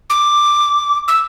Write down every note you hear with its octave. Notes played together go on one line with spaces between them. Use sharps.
D6
E6